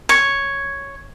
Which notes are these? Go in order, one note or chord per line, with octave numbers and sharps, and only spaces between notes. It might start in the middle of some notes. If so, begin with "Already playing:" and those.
C#5